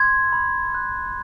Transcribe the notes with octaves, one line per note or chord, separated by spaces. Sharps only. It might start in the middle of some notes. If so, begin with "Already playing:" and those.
Already playing: C6 G#6
B5
F#6